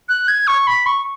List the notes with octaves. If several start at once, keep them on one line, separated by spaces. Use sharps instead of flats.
F#6
G#6
C#6
B5
C#6